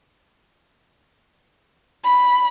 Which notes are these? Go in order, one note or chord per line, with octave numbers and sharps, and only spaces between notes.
B5